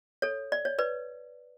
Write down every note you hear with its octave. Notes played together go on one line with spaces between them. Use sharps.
A4 C#5
D5
C#5
B4 D5